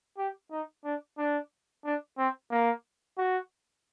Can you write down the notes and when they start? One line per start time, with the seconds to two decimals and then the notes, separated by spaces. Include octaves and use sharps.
0.18 G4
0.51 D#4
0.85 D4
1.18 D4
1.85 D4
2.18 C4
2.51 A#3
3.18 F#4